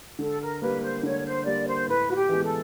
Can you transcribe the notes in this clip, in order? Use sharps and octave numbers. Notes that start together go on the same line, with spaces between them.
D3 A4
A#4
G3 A#3 B4
C5
D3 C#5
C5
G3 A#3 D5
C5
A2 B4
F#4
G4
E3 G#3 B3
A4